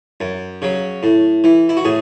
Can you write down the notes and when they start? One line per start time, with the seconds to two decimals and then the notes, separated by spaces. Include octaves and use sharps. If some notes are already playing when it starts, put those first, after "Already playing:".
0.21 F#2
0.62 C#3 F#3
1.03 A2
1.44 E3
1.69 E4
1.77 F#4
1.85 A2 G#4